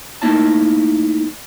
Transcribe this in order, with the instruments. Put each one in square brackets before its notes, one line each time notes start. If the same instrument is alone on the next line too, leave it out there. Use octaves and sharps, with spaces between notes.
[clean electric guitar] A3 A#3 D#4 E4 C#5 A5